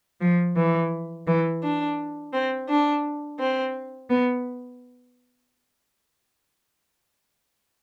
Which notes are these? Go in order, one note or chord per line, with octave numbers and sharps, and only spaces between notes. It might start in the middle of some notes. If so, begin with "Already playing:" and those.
F3
E3
E3
D4
C4
D4
C4
B3